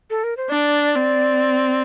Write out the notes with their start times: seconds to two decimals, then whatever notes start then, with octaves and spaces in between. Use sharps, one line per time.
0.10 A4
0.24 A#4
0.37 C5
0.50 D4 D5
0.95 C4